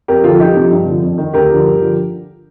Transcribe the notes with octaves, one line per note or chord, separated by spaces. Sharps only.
F2 G4 A#4
D3 F3 F4 A4
C2 D#4 G4
C3 F3
G2
D3 F3
F2
D#3
D2 G4 A#4
D3 F3
G2
D3 F3